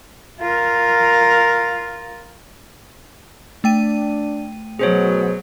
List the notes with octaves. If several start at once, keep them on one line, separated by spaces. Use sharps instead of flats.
F4 A#4
A3 D4 G5 D#7
B2 F#3 G#4 C5 C#5